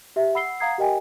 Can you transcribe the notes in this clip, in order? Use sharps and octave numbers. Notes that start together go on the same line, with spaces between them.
G4 E5
F#5 B5 E6 C7 G7
F5 F#5 A#5 D#6 G#6 C7
G4 A#4 D#5 G5 G#5